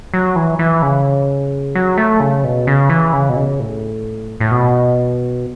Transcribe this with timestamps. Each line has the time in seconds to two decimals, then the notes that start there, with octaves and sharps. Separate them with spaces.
0.14 F#3
0.36 E3
0.59 E3
0.82 C#3
1.75 F#3
1.98 A3
2.20 C#3
2.44 B2
2.67 C#3
2.90 E3
3.13 C#3
3.29 B2
3.36 C#3
3.60 A2
4.40 A2
4.51 B2